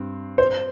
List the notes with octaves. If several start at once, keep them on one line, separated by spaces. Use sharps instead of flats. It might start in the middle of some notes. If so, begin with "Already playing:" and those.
Already playing: G2 C4
C5